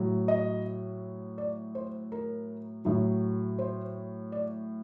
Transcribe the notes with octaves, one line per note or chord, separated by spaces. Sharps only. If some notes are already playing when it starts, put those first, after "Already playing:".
Already playing: A2 F#3
D#5
D5
C5
A#4
A2 F#3
C5
D5